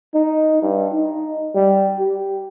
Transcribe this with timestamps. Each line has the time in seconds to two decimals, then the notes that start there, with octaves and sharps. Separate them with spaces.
0.14 D#4
0.62 G2
0.93 D#4
1.55 G3
1.99 G4